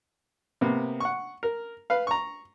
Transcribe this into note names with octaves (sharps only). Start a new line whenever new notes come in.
C3 A#3 B3
F#5 C#6
A#4
B4 F5
A#5 C#6